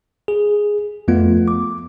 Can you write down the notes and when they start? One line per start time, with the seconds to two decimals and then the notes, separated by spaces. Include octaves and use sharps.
0.28 G#4
1.08 F2 F3 A3 B3 F4
1.48 D6